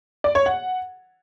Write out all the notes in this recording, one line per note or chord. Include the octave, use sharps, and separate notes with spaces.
D5
C#5
F#5